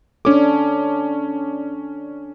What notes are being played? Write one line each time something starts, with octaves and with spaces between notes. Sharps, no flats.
C#4 D4 A4 D6